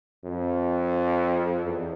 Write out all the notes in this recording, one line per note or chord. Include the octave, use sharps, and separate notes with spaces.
F2
E2